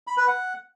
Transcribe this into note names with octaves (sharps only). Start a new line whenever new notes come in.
B5
B4
F#5